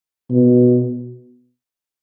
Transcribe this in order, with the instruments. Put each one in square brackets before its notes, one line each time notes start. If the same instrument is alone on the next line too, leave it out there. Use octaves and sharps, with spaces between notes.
[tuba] B2